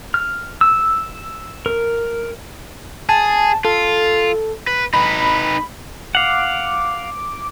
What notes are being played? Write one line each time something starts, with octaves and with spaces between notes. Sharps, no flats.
F6
E6
A#4
G#4 A5
F4 A4
B4
D#4 B4 B5
F5 F#5 D6